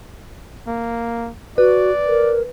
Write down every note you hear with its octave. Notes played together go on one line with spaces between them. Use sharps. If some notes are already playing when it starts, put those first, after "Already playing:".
A#3
F#4 B4 D5
A#4